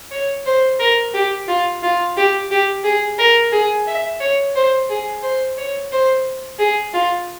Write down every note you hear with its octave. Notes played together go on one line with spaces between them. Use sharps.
C#5
C5
A#4
G4
F4
F4
G4
G4
G#4
A#4
G#4
E5
C#5
C5
G#4
C5
C#5
C5
G#4
F4